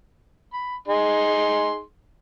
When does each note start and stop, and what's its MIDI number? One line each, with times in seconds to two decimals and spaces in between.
0.54 0.76 83
0.88 1.81 63
0.88 1.81 68
0.88 1.81 84